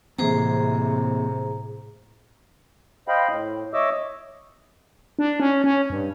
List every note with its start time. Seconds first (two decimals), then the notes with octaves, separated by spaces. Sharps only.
0.18 A2 C3 E3 A#3 C4 G#4 C5 A#5
3.08 C5 D#5 F5 G5 B5
3.29 A2
3.74 C#5 D#5 E5 D6 E6
5.19 D4
5.40 C#4
5.64 C#4
5.90 G2